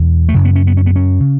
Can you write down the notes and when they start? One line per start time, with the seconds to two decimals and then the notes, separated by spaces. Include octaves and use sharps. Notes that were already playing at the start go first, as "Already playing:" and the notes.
Already playing: E2 B2
0.29 A3
0.34 F#2 C#3 F#3
0.45 B3
0.55 C#4
0.67 B3
0.77 C#4
0.86 B3
0.96 C#4
1.20 C#3